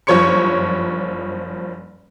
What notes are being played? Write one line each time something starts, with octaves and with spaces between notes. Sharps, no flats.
F#1 G2 F3 C#5 C#6 C#7